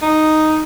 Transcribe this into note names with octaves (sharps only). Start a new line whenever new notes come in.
D#4